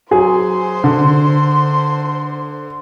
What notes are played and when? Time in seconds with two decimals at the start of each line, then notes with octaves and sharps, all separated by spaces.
0.11 F#3 G#4 C5 C6
0.84 D3